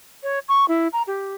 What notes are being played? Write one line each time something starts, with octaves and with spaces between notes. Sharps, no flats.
C#5
C#6
E4
A#5
G4